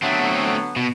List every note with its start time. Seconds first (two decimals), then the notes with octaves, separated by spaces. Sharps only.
0.02 D3 F#3 A3 B3 C4
0.76 B2